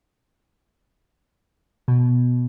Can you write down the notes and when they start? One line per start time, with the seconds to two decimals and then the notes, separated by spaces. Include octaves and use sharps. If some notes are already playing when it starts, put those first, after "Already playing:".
1.88 B2